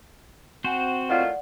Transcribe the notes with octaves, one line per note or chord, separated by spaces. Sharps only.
C4 F#4 C5 F#5 G#5
A2 D#3 F4 D5 F#5